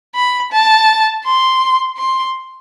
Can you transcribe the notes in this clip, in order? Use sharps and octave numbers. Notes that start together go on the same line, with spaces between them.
B5
A5
C6
C6